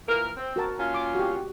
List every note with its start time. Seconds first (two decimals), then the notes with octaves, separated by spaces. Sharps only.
0.07 A#2 E3 A#4
0.36 C4
0.56 F#4 A#4 A5
0.78 A#2 C#4 F4
0.94 D6
1.15 F#4 G4